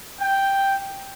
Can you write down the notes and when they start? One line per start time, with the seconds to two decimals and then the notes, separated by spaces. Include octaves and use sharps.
0.19 G5